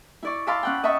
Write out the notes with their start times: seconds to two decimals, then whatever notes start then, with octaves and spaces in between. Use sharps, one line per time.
0.23 E4 D5 C#6
0.47 F5 A5 B5 C6 D6 E6
0.63 C#4 F#5 G5
0.83 D#5 E5 A5 B5 C#6